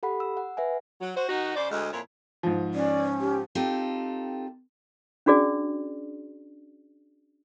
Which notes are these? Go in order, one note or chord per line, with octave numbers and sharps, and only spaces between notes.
G4 A4 F#5 B5
E6
F#5
B4 E5 F#5 G#5
F#3
F#4 C5
D#3 D#4 F#4
C#3 C5 D5
D2 G#3
F2 A#2 E4 C#5
G#2 F3
C#4 D5
G4
C4 D#4 F4 G4 A4
C#4 D4 F#4 G#4 D5